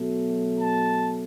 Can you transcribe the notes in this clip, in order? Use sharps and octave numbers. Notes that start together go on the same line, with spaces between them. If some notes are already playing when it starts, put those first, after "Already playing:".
Already playing: B2 F#3 A3
A5